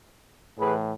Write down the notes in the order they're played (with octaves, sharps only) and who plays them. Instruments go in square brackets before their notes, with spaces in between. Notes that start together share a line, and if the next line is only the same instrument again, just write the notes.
[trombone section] A2 E3 G#4 B4